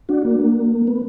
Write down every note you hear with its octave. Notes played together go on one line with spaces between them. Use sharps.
D4 F#4
A#3
A#3
B3